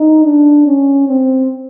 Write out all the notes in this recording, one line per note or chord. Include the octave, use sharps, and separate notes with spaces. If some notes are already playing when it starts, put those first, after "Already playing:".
Already playing: D#4
D4
C#4
C4